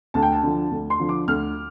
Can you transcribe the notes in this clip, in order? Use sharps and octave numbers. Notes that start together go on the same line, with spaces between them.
D2 A5
G5
A5
D3 F3
D2
C6
D3 F3
D6
D2 F6